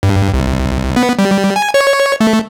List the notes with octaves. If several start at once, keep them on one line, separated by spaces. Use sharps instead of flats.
G2
C2
B3
G3
G#5
C#5
A3